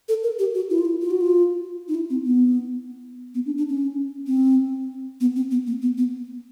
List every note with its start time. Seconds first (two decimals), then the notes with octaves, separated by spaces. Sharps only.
0.09 A4
0.24 A#4
0.39 G4
0.55 F#4
0.70 E4
0.78 F4
0.85 E4
1.01 F4
1.11 F#4
1.21 F4
1.88 D#4
1.95 E4
2.10 C4
2.25 B3
3.35 B3
3.46 D4
3.57 D4
3.69 C#4
4.27 C4
5.20 B3
5.36 C4
5.51 B3
5.67 A#3
5.82 B3
5.97 B3